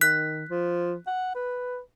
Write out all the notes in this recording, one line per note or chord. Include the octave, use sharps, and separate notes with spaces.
D#3 F#6 B6
F3
F#5
B4